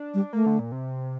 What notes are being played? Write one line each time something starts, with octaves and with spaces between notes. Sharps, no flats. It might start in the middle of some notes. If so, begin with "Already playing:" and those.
Already playing: D4
G3
A3 A#3
D3
A#2
C3